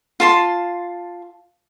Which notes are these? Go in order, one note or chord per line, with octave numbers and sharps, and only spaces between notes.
F4 A5 C6